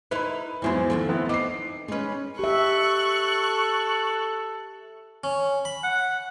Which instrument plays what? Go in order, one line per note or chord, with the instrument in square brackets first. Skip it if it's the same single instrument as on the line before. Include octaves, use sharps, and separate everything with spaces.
[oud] D#4 E4 A#4 [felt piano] B4 B5
[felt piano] E2 G#2 E3 [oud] F#3 C4 C#4
[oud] D#3 F3 A3
[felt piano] B3 C4 E4
[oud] D#4 D#5 [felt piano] D6 C7
[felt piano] G#3 C#4 [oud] D#4 B4
[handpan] G4 E5 [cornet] A4 [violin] C#6 F#6
[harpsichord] C#4
B5
[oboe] F#5